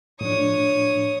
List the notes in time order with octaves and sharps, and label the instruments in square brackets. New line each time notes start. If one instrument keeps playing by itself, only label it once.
[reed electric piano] A2 F3 D4 [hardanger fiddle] C#5 D#6